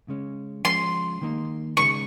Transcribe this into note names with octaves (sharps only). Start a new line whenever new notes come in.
C#3 G#3 C#4
F3 G#3 C#4 C6
D#3 A#3 D#4
C#3 G#3 D#4 C#6